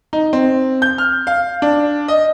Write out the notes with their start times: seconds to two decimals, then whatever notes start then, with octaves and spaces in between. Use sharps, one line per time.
0.13 D#4
0.33 C4
0.82 G6
0.98 F6
1.27 F5
1.62 D4
2.08 D#5